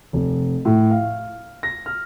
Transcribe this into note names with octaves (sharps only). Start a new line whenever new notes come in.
F1
A2
F5
A#6
F6